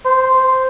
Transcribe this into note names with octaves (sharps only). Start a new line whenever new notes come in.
C5